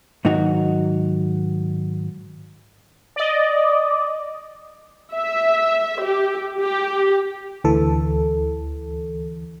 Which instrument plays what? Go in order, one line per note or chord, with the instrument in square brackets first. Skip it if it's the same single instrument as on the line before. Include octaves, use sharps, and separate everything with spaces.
[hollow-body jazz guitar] G#2 D#3 F#3 D#4 F#4
[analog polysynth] D5 D#5
[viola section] E5
G4
G4
[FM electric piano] D2 E3 A4